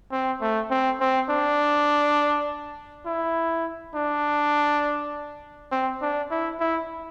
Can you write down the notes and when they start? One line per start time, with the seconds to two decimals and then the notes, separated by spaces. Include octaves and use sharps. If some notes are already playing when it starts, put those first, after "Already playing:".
0.12 C4
0.41 A3
0.70 C4
1.00 C4
1.30 D4
3.06 E4
3.95 D4
5.72 C4
6.01 D4
6.30 E4
6.60 E4